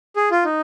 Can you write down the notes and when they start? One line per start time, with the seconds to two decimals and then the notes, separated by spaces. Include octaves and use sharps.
0.16 G#4
0.31 F4
0.45 D#4